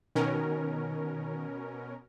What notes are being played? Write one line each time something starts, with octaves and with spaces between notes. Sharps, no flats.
B2 D#3 C#4 A#4